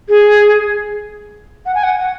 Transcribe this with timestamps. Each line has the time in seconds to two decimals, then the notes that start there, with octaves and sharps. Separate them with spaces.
0.09 G#4
1.66 F#5
1.75 G#5
1.83 F#5
1.99 F#5